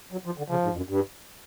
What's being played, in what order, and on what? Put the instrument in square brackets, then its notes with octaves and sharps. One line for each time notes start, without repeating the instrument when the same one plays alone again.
[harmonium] F#3
F3
D3
[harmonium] C#3 [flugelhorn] F3
[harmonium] G#2
F2
F#2
G2